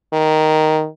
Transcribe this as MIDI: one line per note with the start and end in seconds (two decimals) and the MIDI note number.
0.13 0.87 51